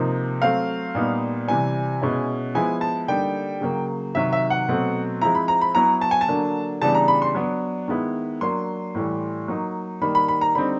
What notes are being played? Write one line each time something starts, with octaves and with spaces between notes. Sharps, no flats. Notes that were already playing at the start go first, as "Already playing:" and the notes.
Already playing: C3 F3 A#3 D#4
F#3 A3 C4 F5
A#2 G3 B3 D#4
C3 E3 G3 G#5
B2 G#3 C#4 E4
F3 G#3 B3 E4 G#5
A5
D3 G3 A#3 D#4 G5
C#3 F#3 A#3
C3 D#3 F#3 E5
E5
F#5
B2 F#3 A3 C4
F3 G#3 C4 E4 A#5
B5
A#5
B5
F#3 B3 E4 A#5
A5
G#5
A5
D3 F#3 A#3 D4
C#3 E3 G3 B3 D4 A5
A#5
B5
C6
F#3 B3 D4
D#3 G#3 B3 E4
F#3 A#3 D4 C6
A2 E3 G3
F#3 A#3 D#4
D#3 G3 A#3 B5
B5
B5
A#5
D3 G3 C4 D#4 B5